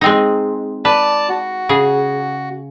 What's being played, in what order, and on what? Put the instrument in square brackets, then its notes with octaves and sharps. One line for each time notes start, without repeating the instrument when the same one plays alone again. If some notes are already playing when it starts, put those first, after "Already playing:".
[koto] G#3 C4 D#4
[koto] B4 [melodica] D5 A5
[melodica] F#4
[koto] C#3 G#4